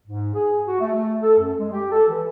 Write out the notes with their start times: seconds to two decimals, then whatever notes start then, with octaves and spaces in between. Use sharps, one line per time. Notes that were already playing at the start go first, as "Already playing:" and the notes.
0.07 G#2
0.34 G#4
0.66 F#4
0.80 A3
0.94 A3
1.22 A4
1.38 F#2
1.59 G#3
1.71 G4
1.91 A4
2.08 E3